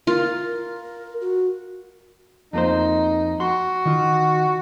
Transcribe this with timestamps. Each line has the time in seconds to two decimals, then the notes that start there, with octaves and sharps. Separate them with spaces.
0.07 F4 A#4
1.21 F#4
2.53 F2 A#3 D#4 C5
3.40 F#4 C6
3.86 D#3 F4